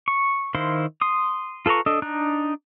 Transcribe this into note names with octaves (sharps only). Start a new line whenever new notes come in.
C#6
D#3 E4 C5 F5 C6
C6 D#6
F4 A4 B4 A#5 C#6
D4 A4 D#5
D4 D#4 A#5 F#6